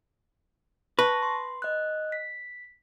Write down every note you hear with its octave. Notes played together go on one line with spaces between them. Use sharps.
B4 A5 C#6 A#6
C6
D#5 F#6
B6